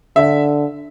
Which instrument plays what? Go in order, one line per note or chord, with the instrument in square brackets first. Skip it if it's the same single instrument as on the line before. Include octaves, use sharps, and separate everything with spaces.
[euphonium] D3 [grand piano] E5